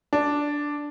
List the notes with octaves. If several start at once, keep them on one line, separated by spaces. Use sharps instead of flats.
D4